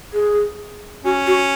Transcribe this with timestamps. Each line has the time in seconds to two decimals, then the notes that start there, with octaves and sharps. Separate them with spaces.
0.13 G#4
1.04 C#4 F#4
1.27 F#4